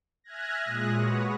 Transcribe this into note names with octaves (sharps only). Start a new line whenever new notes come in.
E5 G#5 F6 F#6 G#6 A#6
A#2 G#3 G#4 D#6 F#6 A#6
F#4 B4 C#5